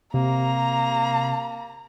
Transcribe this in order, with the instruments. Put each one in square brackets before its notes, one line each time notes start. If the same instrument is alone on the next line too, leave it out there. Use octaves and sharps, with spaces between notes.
[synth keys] C3 [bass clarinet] A#3 [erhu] A#5